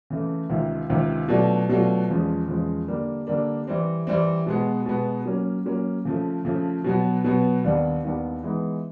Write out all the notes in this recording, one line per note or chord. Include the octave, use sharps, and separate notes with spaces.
C#3 E3 A3
C#2 C3 D#3
C#2 C3 D#3
B2 F#3 A3 D4 F4
B2 F#3 A3 D4 F4
E2 C#3 F3 G#3
E2 C#3 F3 G#3
D3 G3 A#3 D4
D3 G3 A#3 D4
E3 G3 C4
E3 G3 C4
B2 G#3 B3
B2 G#3 B3
F#3 A#3 C#4
F#3 A#3 C#4
C#3 F3 A3
C#3 F3 A3
B2 F#3 B3
B2 F#3 B3
D#2 D#3 G3 B3 D4
D#2 D#3 G3 B3 D4
E3 G#3 B3 D#4